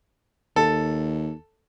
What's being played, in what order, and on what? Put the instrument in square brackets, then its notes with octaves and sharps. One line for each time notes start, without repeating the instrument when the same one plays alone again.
[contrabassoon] D#2 [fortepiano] A4